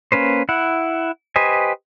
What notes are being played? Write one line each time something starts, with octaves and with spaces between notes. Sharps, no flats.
A#3 C#4 B4 C5
E4 F#5
G4 B4 C5 D#5 G#5